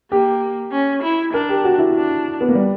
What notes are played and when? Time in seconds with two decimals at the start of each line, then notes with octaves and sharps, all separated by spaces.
0.11 A#3 G4
0.72 C#4
1.03 E4
1.33 D4 A#4
1.49 G4
1.64 F#4
1.79 E4
1.94 D4
2.41 B3
2.49 A#3
2.55 G3